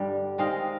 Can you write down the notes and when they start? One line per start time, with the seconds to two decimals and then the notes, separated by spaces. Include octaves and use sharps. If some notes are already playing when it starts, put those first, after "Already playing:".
Already playing: G2 D3 G3
0.38 D#3 G#3 C4 D#5 F5